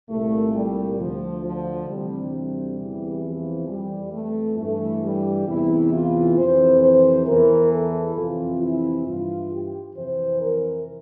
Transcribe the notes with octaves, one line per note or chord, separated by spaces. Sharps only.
C2 A#2 A3
G3
D2 D3 F3
F3
D2 C3 E3 G3
G3
E2 C3 E3
F3
F2 E3 G3
A3
G2 E3 A3
G3
E2 C3 E3 E4
F4
F2 C3 E3 C5
C5
E2 E3 A#4
A4
F2 C3 E3 F4
E4
G2 E3 F4
G4
F2 C3 E3 C5
A#4